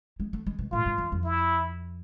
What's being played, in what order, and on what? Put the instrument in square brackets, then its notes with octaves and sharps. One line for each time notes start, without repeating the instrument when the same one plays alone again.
[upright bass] G#3
A3
G#3
B2
[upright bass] A2 [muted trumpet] F4
[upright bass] G#2
E2
F2
[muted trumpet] E4